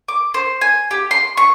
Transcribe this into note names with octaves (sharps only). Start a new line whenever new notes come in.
D6
C5
G#5
G4
C6
C#6